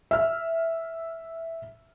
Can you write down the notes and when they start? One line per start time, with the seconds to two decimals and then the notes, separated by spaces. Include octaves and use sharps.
0.11 E5 F6